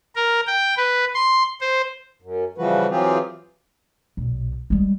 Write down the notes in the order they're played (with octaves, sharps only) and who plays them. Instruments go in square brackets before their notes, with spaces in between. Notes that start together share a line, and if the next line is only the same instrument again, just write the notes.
[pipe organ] A#4
G5
B4
C6
C5
[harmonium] F#2
C#3 E3 F3 G3 F#4 B4
E3 F#3 C4 F4 G4 G#4
[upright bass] B1 A#2
G3 G#3